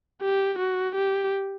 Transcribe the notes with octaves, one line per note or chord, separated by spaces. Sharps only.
G4
F#4
G4